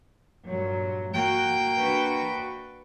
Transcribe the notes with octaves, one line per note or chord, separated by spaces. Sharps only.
G2 A#2 F#3
A#3 F#4 G5
D4 F#4 B4